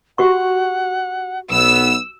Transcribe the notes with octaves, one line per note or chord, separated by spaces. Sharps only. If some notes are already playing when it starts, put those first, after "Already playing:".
F#4 G4 F#5 C#6
B1 B3 E6